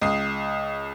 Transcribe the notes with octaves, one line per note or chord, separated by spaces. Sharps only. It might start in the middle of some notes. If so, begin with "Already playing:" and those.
C#2 D#6 C7